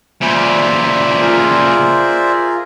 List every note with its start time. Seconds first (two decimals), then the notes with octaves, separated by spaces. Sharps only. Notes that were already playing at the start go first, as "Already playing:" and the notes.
0.21 A#2 C#3 C5 D5 E5
1.20 F4 G#4 A#4